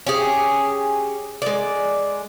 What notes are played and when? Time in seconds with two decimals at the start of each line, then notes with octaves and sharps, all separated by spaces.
0.07 C#4 G4 G#4
1.42 G#3 D5